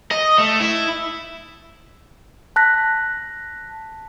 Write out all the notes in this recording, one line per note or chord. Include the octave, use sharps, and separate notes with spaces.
D#5
A3
E4
A5 F#6 A#6 B6